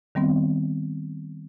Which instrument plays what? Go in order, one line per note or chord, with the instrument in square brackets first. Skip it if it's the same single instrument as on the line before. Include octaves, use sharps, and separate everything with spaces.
[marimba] D#3 G3 B3 C4